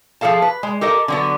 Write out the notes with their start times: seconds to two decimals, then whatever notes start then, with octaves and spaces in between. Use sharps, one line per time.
0.21 F3 G#4 A4 F5 A5
0.42 B4
0.63 G#3
0.81 G4 A4 A#4 D#5
1.08 D3 F#3 B3